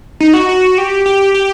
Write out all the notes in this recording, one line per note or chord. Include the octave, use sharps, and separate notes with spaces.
D#4
F#4
F#4
G4
G4
G4